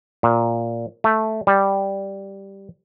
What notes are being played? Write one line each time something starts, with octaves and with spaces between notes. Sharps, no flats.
A#2
A3
G3